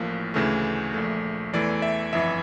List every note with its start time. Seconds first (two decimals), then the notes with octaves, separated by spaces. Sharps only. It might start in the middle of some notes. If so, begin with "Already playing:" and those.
Already playing: A1 A2 F3 A#3
0.34 D2 C#3 E3 A3
0.94 A#1 A#2 A3
1.53 E2 E3 A3 D5
1.82 E5
2.13 G1 F2 E3 E5